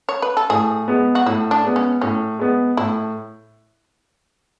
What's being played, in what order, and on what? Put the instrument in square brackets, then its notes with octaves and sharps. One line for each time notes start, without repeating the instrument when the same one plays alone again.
[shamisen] C#5
B4
A4
[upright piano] A2 [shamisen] G#4
[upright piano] G#3 B3
[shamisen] F#4
[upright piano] A2 [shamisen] E4
[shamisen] D4
[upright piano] G#3 B3
[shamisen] C#4
[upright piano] A2 [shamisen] C#4
[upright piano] G#3 B3
[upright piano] A2 [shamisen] E4